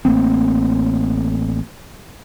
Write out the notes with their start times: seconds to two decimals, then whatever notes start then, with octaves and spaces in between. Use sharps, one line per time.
0.05 A1 A3 A#3 C4